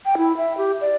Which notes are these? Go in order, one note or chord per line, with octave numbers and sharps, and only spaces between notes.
G5
E4
E5
G4
D5